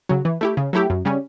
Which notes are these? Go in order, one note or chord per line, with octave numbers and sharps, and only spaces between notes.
C#3 F#3
E3
A3 E4 G4
C#3
F#3 A3 E4 G4
F#2
C#3 G3 C#4